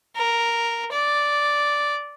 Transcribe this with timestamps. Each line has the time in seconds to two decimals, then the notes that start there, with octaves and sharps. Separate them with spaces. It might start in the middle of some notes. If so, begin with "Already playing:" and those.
0.16 A#4
0.92 D5